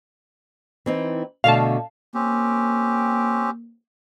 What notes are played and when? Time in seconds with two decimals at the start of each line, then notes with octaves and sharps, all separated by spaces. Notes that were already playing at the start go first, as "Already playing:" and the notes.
0.86 E3 C4 D#4
1.44 B2 D3 A3 F5 A5
2.15 A#3 C4 C#4 G4